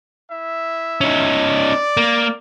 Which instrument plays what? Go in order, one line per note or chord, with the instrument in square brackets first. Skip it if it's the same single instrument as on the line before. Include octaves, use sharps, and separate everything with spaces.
[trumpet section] E4 E5
[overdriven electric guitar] C#4 D#4
[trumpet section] D5
[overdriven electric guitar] A#3